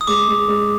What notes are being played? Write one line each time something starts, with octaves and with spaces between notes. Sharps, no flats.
D#6
G#3 D6
G#3
G#3